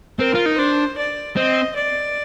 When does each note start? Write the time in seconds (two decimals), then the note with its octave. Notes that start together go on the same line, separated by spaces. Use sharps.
0.19 C4 A#4
0.35 F4
0.46 D#4
0.58 D4 C5
0.98 D5
1.36 C4 D#5
1.76 D5